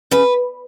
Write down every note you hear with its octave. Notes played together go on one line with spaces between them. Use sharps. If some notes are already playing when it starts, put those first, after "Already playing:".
C#3 B4